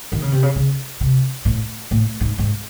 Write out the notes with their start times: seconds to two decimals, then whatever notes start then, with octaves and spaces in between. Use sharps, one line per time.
0.12 D#3
0.22 C#3
0.32 C3
0.43 C#3
0.56 C#3
1.00 C3
1.45 A2
1.91 A2
2.21 G#2
2.38 G#2